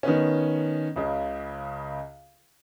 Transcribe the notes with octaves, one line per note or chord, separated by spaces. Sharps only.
D#3 B3 C#4
C#2 C#3